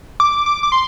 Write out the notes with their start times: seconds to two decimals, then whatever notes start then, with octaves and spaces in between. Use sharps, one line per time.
0.20 D6
0.46 D6
0.63 D6
0.72 C6